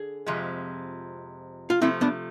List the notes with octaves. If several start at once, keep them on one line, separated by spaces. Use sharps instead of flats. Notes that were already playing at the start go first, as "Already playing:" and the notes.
Already playing: D3 G#4
F2 C3 F3 G#3
F4
C3 F3 A3 C4 E4
B3 D4